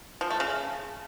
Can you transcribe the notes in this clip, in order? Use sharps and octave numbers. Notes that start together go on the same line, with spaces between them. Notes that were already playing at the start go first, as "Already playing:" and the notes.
F3
A3
C#3